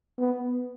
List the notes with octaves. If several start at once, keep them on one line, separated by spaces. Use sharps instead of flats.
B3